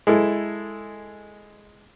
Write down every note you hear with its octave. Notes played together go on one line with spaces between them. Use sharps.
G#3 E4 A4